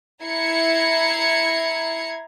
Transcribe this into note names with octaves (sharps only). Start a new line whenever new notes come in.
E4 A#5 G#6 C7 C#7